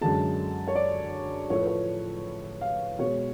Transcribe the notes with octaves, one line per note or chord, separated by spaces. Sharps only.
F#2 D3 G#3 A5
C#5
D5
A2 F3 A3 C#5
B4
C#5
F5
B2 G#3 C#5